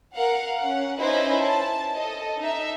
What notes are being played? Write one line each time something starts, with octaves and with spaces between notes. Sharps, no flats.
A#4 F5 F#5
C#4 F#5
C#4 D#4 E4 B4 C5 D#5
A5
A4 D#5
D#4 E5